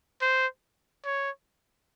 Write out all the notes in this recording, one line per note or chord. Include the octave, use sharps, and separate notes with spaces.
C5
C#5